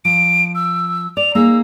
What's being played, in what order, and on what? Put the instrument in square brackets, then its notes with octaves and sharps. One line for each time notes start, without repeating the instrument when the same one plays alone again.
[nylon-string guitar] F3 [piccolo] D7
[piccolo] E6
[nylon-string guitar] D5 [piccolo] F7
[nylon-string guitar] A#3 D#4 G#4 [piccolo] E6